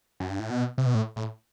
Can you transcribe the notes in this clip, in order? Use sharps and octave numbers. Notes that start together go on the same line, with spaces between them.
F#2
G2
A2
B2
C3
B2
A2
A2